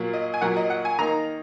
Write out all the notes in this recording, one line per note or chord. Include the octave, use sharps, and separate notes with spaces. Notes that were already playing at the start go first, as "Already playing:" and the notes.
Already playing: A#2 F#3 A#3
D#5
G#5
A#2 F#3 A#3 F#5
D#5
F#5
G#5
D#3 A#3 D#4 A#5